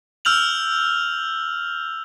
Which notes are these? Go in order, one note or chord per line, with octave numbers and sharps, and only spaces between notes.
E6 F6 G6 F7 F#7